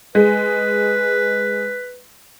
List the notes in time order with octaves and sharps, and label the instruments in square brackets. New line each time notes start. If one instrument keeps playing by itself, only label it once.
[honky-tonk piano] G#3 G#4 [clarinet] B4